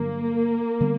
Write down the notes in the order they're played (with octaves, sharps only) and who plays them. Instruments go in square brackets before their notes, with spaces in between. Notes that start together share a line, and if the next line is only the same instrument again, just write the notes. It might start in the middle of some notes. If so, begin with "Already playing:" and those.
Already playing: [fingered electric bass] G2 D3 F#3 [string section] A#3
[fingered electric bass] D3 G3 B3